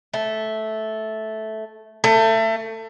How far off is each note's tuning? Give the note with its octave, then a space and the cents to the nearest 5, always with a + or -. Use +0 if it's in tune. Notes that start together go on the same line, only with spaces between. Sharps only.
A3 -10
A3 +25